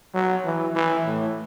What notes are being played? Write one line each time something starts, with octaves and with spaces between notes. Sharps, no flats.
F#3
E3
E3
A2